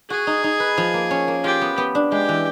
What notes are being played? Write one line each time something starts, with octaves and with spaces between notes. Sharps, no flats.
F#4 G#4
D#4
D#4
B4
F3
A#3
C#4
A#3
F4 G4
B3
B3
D4
G#3 G4
E3